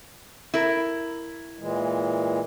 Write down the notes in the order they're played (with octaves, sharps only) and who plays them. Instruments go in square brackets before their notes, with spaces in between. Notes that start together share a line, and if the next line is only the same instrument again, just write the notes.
[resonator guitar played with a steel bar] E4 A#4
[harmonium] A#2 E3 G#3